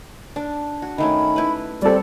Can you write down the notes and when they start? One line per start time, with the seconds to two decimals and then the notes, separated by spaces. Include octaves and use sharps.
0.36 D4
0.82 F#4
0.98 D#3 A3 C#4 B5
1.36 E4 B4
1.82 G3 C4 A4 D5